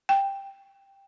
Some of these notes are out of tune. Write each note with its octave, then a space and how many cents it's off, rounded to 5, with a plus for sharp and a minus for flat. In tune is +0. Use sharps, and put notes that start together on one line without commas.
G5 +5